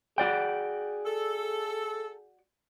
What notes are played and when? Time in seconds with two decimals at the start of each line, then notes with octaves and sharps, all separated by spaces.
0.18 F#4 G#4 D5 G5
1.06 A4